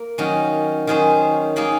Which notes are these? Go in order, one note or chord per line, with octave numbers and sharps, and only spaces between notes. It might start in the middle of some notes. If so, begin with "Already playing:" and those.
Already playing: A#3
D#3 F#3 C#4
D#3 F#3 C#4 G#4 C5
D#3 A#3 D#4 G#4